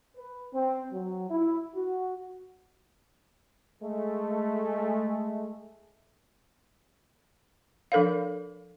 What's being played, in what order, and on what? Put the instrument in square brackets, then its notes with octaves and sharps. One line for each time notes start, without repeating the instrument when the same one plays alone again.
[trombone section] B4
C4
F#3
E4
F#4
[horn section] G#3 A3
[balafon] F3 D4 A4 A#4 C#5 F5